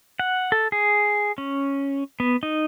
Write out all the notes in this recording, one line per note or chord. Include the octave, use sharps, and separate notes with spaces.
F#5
A4
G#4
C#4
B3
D#4